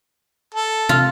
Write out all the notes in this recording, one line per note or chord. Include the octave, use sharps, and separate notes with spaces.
A4
C3 F4